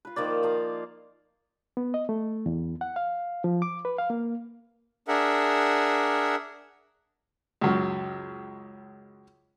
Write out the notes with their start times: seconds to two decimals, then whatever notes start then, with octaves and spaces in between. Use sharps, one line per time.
0.05 F4 B4
0.16 D#3 F3 A#3 D5
0.43 F3 F5 A#5
1.77 B3
1.94 D#5
2.09 A3
2.46 E2
2.81 F#5
2.96 F5
3.44 F3
3.62 D6
3.85 B4
3.98 F5
4.10 A#3
5.08 D4 G#4 A#4 E5 F#5
7.61 C#2 F#2